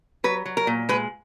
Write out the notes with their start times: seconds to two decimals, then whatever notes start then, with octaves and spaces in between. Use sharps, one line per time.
0.24 F#3 B4
0.46 F#3
0.57 A#4
0.67 A#2
0.89 G#3 B4